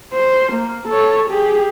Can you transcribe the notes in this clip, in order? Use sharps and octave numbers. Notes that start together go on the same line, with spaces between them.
C5
A#3
A4 C#5
G4 G#4